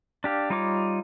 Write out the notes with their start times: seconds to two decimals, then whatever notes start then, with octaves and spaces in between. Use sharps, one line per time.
0.24 D4 G4 F5
0.50 G3 D#4 F4 C#5 D6